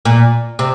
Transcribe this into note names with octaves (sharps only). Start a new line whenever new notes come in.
A#2
C3